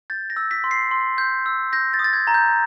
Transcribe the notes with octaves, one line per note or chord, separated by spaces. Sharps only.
G6 A6
A#6
E6
B6
C6
C7
C6
G6
E6
G6 A#6
A6
D#6
A6
G#6
A#5
G6